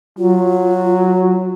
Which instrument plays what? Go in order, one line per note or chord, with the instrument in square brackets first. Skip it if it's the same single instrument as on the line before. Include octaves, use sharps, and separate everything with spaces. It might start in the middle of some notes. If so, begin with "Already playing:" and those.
[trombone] F#3 [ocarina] F4